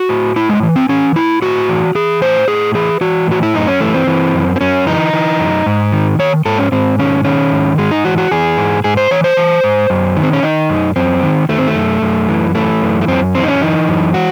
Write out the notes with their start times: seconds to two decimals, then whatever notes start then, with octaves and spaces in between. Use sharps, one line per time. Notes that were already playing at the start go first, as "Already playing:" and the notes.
Already playing: F#4
0.09 A2
0.36 A2 E4
0.49 G#3
0.63 E3
0.76 C4
0.89 E3 C#4
1.16 A2 E4
1.42 A2 F#4
1.69 E3
1.95 E3 G#4
2.21 A2 C5
2.48 A2 G#4
2.75 E3 G#4
3.01 E3 F#4
3.28 A2 F#4
3.43 E4
3.54 F#2 D#4
3.68 C#4
3.81 E3 A3
3.94 C4
4.07 E3
4.34 F#2
4.56 C4
4.61 F#2 C#4
4.87 E3 D#4
5.13 E3
5.39 F#2
5.66 G#2
5.93 D#3
6.19 D#3 C#5
6.45 G#2 A4
6.59 C#4
6.72 G#2 C4
6.99 D#3 C#4
7.25 D#3 C#4
7.52 G#2
7.78 G#2 G#3
7.91 D#4
8.05 E3 F#4
8.18 F#4
8.31 E3 G#4
8.58 G#2
8.84 G#2 G#4
8.97 C5
9.11 E3 C#5
9.24 C5
9.37 E3
9.64 G#2
9.90 F#2
10.17 D#3
10.23 C4
10.33 C#4
10.43 D#3 D#4
10.69 F#2
10.96 F#2 C4
11.23 D#3
11.49 D#3 A3
11.58 C4
11.67 A3
11.75 F#2
12.02 F#2
12.29 E3
12.55 E3 A3
12.82 F#2
13.01 A3
13.08 F#2 C4
13.35 E3 C4
13.44 D#4
13.48 C#4
13.61 E3 D#4
13.88 F#2
14.14 F#4